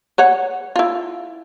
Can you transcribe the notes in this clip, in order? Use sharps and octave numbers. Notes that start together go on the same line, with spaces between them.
B4 C#5 F#5
E4 F4